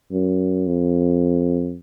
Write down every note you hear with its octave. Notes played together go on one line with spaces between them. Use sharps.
F#2
F2